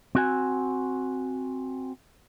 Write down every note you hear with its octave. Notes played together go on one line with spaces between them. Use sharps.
C4 F#4 G#5